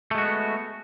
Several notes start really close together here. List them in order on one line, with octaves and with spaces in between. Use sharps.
A3 G#3 F#4 B3